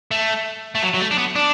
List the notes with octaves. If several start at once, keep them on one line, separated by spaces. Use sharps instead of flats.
A3
A3
F#3
F#3
A3
D4
B3
D4